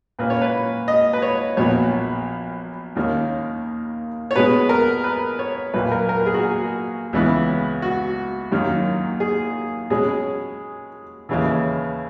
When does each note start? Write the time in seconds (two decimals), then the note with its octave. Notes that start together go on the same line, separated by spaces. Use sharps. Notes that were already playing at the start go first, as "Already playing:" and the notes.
0.19 A#2 A#3 C#4 B4
0.30 C#5
0.42 B4
0.88 D#5
1.13 B4
1.22 C#5
1.57 A#1 A#2 F#3 B3 C#5
2.96 D#2 D#3 A#3 C#4
4.31 C#5
4.36 B2 G#3 B3 B4
4.69 A#4
5.04 B4
5.39 C#5
5.74 B1 A#2 A#3 B4
5.92 A#4
6.09 A#4
6.26 G#4
6.34 F#4
6.43 G#4
7.13 C#2 C#3 E3 B3
7.82 F#4
8.52 F#2 D#3 F#3 A#3 C#4
9.20 G#4
9.90 B2 G#3 C#4 G#4
11.29 D#2 C#3 E3